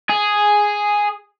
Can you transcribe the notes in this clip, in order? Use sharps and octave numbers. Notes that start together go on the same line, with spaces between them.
G#4